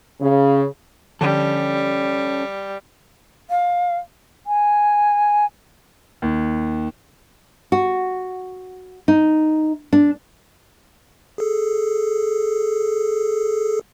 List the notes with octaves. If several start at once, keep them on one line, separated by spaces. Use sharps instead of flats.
C#3
D3 F3 G3 C#4 A4
F5
G#5
D#2
F#4
D#4
D4
G#4 A4